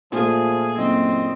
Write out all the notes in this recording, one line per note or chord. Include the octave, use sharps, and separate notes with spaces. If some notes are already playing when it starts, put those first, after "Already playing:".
A#2 F3 A3 F4 G#4
F#1 C4 D#5